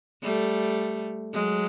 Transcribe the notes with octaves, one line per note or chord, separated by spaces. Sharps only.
G3 A3
F#3 G#3